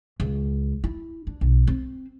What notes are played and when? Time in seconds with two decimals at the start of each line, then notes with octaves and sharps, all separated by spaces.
0.20 C#2
0.84 E4
1.27 D4
1.41 B1
1.67 C4